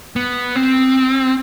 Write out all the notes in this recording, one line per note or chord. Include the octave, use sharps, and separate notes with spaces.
B3
C4